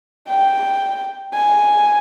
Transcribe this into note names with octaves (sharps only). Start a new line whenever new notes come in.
G5
G#5